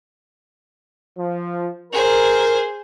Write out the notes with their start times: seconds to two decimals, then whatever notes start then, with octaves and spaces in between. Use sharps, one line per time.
1.18 F3
1.93 G#4 A#4 C5